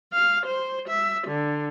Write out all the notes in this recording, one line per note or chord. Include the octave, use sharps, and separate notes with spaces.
F5
C5
E5
D3